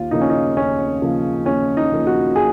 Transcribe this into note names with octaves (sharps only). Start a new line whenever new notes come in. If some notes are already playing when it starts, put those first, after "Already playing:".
Already playing: D#2 F4
C#3 F3 A#3 D#4
C#4
D#4
D#2 C#4
C#3 F3 A#3
D#2 C#4
D#4
C#3 F3 A#3
F#4
G#4